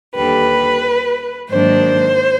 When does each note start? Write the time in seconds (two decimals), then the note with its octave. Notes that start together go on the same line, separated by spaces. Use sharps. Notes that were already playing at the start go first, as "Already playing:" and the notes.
0.15 D#2 D3 G3 B4
1.50 G#2 D#3 F#3 A#3 D4 C5